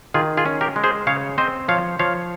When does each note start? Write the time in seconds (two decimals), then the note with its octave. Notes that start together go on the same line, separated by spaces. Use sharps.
0.14 D#3 F4 G#4
0.37 F4 G#4
0.46 C#4
0.61 G4 A#4
0.76 G#3
0.84 G#4 C5
1.07 C#3 C#5 F5
1.38 C4 C5 D#5
1.68 F3 C#5 F5
1.99 F3 C#5 F5